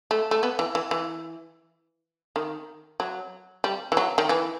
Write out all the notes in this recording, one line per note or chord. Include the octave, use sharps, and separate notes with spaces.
A3
A3
B3
E3
E3
E3
D#3
F#3
G3
E3
F#3
D#3
E3